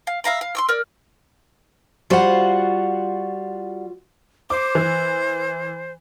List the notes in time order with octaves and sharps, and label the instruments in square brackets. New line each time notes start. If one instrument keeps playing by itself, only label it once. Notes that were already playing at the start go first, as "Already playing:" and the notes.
[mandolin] F5
E5 F5 A#5 B5
F5
C6 C#6 E6
A#4 D5
[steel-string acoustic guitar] G3 F#5 [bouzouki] F4 F#4 C5
[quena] C5 [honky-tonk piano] D6
[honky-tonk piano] E3